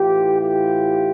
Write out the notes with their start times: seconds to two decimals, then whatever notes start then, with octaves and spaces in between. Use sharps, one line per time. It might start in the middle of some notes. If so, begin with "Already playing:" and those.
Already playing: A2 E3 F4 G4
0.40 F4 G4